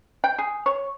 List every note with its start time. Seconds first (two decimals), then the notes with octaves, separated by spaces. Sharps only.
0.24 G5
0.38 G#4
0.66 C#5